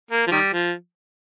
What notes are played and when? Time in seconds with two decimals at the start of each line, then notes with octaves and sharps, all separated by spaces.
0.11 A#3
0.27 F3
0.32 D#3 G3
0.53 F3